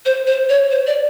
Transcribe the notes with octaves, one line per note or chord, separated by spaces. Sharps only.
C5
C5
C#5
C5
D5